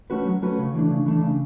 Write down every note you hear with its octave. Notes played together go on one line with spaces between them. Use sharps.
A3 C#4 F#4 B4
F#3
A3 C#4 F#4 B4
C#3
E3 A3 D4
C#3
E3 A3 D4
C#3